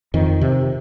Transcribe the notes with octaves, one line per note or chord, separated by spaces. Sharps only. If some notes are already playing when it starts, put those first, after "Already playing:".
F2 D#3
C3